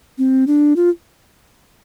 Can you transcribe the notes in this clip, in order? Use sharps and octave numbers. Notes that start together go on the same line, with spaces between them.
C4
D4
F4